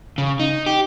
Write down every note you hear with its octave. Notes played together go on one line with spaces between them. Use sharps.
C#3
D#4
G4